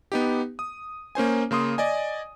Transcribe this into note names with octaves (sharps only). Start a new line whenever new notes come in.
B3 D#4 G4
D#6
A#3 C#4 C5 G#5
C#3 A#3 C6 D#6
D5 D#5 G#5